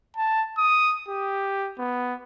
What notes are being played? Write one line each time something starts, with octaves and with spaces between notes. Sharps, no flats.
A5
D#6
G4
B3